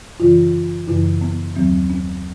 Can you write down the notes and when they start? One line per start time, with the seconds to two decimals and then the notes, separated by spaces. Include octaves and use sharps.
0.20 F#2 C#3 E3 F4
0.87 F#2 C#3 E3 E4
1.21 B3
1.56 D#2 D#3 F#3 C4
1.90 C#4